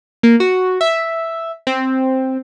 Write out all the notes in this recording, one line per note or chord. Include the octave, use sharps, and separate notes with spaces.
A#3
F#4
E5
C4